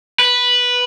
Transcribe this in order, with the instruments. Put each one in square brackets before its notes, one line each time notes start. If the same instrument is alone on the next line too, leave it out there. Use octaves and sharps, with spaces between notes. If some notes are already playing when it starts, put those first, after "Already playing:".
[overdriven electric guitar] B4